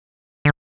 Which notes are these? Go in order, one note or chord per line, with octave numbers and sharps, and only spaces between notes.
D3